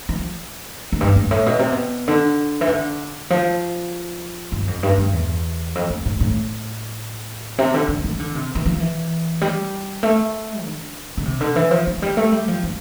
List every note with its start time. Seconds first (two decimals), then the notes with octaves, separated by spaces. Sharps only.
0.09 F3
0.92 F2
1.01 G2
1.16 G2
1.31 A2
1.46 B2
1.59 C3
1.72 B2
2.08 D3
2.61 E3
2.68 D3
3.30 F3
4.52 G2
4.67 F2
4.83 G2
4.98 G2
5.13 E2
5.75 F2
5.90 F2
6.05 A2
6.20 A2
7.58 C3
7.74 D3
7.88 D3
8.04 E3
8.19 D3
8.35 C3
8.55 E3
8.66 F3
8.80 E3
9.41 G3
10.03 A3
10.64 D3
11.17 D3
11.25 C3
11.41 D3
11.56 E3
11.71 F3
11.87 F3
12.02 G3
12.17 A3
12.32 G3
12.48 F3
12.63 F3